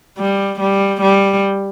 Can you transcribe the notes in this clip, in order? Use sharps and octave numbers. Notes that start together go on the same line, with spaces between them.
G3
G3
G3